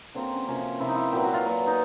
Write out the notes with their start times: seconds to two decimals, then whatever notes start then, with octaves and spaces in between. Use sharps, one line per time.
0.15 D3 F#3 A#3 C4
0.32 C#4
0.48 C3 F3 A#3 C#4
0.80 C3 F3 A#3 E4
0.88 D#4
0.96 E4
1.12 A#2 F#3 B3 G4
1.24 F#4
1.34 F4
1.45 A#2 F#3 B3
1.67 D#4